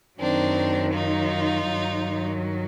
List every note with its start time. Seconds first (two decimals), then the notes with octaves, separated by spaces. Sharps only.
0.20 F#2 D#3 F#3 C4 D4
0.94 D#4 F4
1.68 G2 D#3 F#3